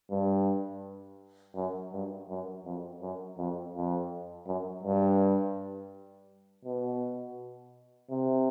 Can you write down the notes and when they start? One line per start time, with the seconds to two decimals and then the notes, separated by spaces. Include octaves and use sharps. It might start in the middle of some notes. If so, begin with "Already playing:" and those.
0.11 G2
1.56 F#2
1.93 G2
2.29 F#2
2.65 F2
3.02 F#2
3.38 F2
3.74 F2
4.47 F#2
4.83 G2
6.65 B2
8.11 C3